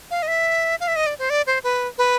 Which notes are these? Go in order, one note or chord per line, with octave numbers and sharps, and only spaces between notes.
F5
D#5
E5
F5
E5
D#5
D5
C5
D5
C5
B4
B4